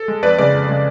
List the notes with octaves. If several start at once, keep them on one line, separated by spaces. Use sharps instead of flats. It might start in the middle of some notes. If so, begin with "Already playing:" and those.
Already playing: A4
G#3
F2 B4 D5
C#3 G#3 B4 D5
F2
C#3 G#3